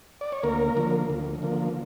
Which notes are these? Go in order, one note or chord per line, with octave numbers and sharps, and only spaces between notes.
D5
C#5
D2 A#3 A#4
D3 F3 A#3
D2
D3 F3 A#3